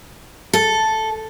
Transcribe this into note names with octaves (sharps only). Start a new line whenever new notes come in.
A4